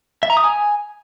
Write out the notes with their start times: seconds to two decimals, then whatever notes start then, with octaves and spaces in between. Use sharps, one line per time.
0.23 E5
0.30 A#5
0.37 D#6
0.44 G#5